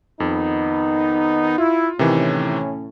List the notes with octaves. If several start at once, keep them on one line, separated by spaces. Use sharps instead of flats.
F2 D#3 B3 D#4
E4 F4
A2 C3 D#3 E3 C#4